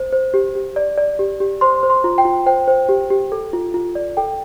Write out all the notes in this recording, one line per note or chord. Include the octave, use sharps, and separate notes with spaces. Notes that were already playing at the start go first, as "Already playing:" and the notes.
Already playing: C5
C5
G4
G4
D5
D5
G4
G4
C5 C6
C5
C6
F4
G5
F4
C5 G5
C5
G4
G4
A4
F4
F4
D5
A4 G5